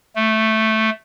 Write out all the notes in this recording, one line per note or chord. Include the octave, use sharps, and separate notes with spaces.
A3